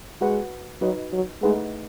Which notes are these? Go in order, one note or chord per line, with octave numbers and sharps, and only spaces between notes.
G#3 F#4 B4 F#5
F#3 D#4 F#4 B4 D#5
F#3
G#3 A3 D#4 G#4 B4 F#5